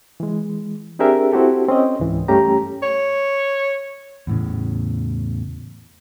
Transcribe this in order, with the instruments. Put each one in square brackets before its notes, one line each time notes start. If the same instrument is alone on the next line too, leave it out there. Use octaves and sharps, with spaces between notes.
[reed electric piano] E3 G#3
C4 D4 G4 G#4 A#4 E5
C4 E4 F#4 G4 A4
C4 C#4 D#5
C#2 G#2 E3
G2 G3 A3 C#4 G4 A#5
[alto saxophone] C#5
[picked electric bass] E2 A2 C#3